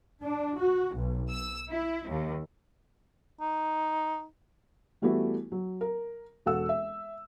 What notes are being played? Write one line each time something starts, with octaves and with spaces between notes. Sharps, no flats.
D4
F#4
B1
E6
E4
D#2
D#4
E3 G3 A3 B3 E4 F#4
F#3
A#4
E1 F#4 A4 F#5 E6
E5